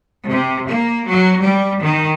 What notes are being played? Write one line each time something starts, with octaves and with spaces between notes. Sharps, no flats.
C3
A#3
F#3
G3
D#3